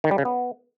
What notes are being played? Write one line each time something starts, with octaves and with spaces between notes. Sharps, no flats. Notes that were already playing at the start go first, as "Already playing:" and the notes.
D#3
G3
C#3
B3